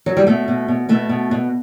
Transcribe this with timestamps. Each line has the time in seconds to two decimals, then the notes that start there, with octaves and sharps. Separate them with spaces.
0.06 F#3
0.17 G3
0.27 B2 A3
0.48 B2
0.68 B2
0.89 B2 A3
1.09 B2
1.31 B2